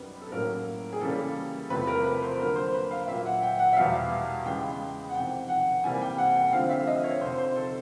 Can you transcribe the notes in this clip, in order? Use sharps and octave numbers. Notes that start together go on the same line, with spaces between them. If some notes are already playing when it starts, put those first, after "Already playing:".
Already playing: F#2 D#3 G3 B3
A4
A2 F#3 A#3 C#4 A#4
G#4
C#3 E3 G3 A#3 C#4 A4
E2 C3 F3 A3 B4
A#4
B4
C5
D3 F#3 A#3 A#4
C5
B4
F5
A#2 F#3 A#3 E5
F#5
G5
F#5
E5
E2 B2 G3 F5
C#3 E3 G#3 B3 G5
F#5
F2 C3 D#3 G5
F#5
C3 E3 G3 A#3 G#5
G5
F#5
G5
D3 F3 A3 C4 F5
E5
D#5
C#5
F2 C3 D#3 C5
C5
A4